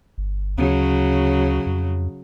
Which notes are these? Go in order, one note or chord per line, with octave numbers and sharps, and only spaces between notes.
G1
D2 C#3 F#3
F2